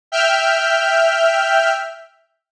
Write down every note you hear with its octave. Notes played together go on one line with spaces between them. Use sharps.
E5 G5 F6 G6